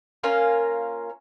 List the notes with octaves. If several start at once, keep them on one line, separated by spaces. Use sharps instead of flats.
A#3 C#4 F4 A#4